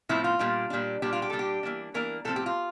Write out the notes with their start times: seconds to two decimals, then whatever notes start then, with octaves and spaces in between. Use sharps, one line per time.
0.09 A2 F3 C4 E4
0.24 F4
0.39 A#2 G3 D4
0.70 A#2 G3 D4
1.02 A#2 G3 D4 G4
1.13 F4
1.22 G4
1.30 A#2 G3 D4 A4
1.39 G4
1.63 E3 A#3 D4
1.94 E3 A#3 D4 A#4
2.25 A2 F3 C4 A4
2.36 G4
2.46 F4